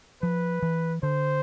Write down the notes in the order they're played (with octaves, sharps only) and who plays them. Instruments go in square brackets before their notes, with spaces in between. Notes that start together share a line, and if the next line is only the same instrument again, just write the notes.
[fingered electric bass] F3 [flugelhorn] B4
[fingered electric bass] E3
[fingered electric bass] D3 [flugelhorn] C5